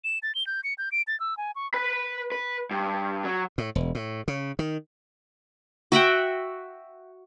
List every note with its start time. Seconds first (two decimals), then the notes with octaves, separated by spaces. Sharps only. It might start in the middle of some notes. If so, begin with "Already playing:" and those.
0.04 E7
0.23 A6
0.35 G7
0.47 G6
0.64 C#7
0.78 G6
0.92 D7
1.07 A6
1.20 E6
1.37 G#5
1.56 C#6
1.74 B4 B5
2.32 B4
2.71 G2
3.24 F#3
3.58 A2
3.75 E1
3.95 A2
4.28 C#3
4.59 D#3
5.92 F#4 E5 F#5 G5